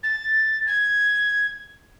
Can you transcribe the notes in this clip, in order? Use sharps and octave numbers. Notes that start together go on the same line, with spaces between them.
A6
G#6